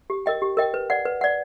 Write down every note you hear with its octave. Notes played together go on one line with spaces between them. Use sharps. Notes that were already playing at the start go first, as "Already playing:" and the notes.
G4
A#4 D#5 G5
G4
A#4 D#5 G5
B4
D5 F#5
B4
D5 F#5